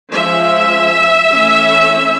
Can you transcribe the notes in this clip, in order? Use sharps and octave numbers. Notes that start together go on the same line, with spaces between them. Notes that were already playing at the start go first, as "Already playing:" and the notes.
F3 G#3 C#4 E5
E3 A3 C#4